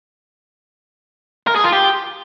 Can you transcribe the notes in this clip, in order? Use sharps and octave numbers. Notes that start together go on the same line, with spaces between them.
A#4
G#4
F4
G4